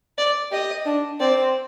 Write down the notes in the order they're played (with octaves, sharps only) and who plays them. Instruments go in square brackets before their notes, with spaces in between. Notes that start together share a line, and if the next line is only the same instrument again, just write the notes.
[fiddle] D5
[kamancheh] G4 [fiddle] D#5
[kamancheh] D4
[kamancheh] C4 [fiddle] D5